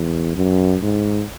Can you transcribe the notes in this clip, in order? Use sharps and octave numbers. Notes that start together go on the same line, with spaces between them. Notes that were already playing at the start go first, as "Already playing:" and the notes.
Already playing: E2
F#2
G#2